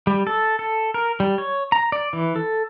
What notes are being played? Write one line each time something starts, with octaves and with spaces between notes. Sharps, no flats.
G3
A4
A4
A#4
G3
C#5
A#5
D5
E3
A4